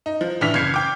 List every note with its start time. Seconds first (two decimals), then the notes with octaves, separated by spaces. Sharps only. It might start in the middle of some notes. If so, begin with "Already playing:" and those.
0.06 D#4
0.21 F3
0.41 A2 E3 D4 F6 B6 F7
0.54 F#1 C#3 G#6 C7 C#7
0.74 G5 D6